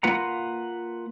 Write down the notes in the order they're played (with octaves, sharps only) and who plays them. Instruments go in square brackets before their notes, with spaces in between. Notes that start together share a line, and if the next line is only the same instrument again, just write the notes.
[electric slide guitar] A#3 F4 B4 F#5 A#5